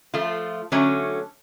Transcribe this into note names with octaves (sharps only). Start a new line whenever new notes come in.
F3 A3 F4
D3 F#3 A3 C#4